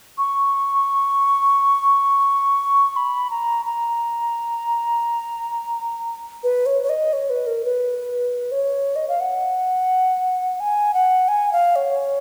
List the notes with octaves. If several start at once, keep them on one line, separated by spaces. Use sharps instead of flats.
C#6
B5
A#5
A#5
B4
C#5
C#5
D#5
C#5
B4
A#4
B4
C#5
D#5
F5
F#5
G#5
F#5
G#5
F5
C#5